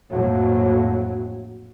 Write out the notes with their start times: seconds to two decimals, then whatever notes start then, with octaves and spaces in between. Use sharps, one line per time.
0.11 A#1 F2 A2 F#3